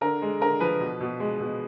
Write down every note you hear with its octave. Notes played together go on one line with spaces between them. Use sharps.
D3 A#4
G#3
D3 A#4
F3 B4
B2
B2
G#3
B2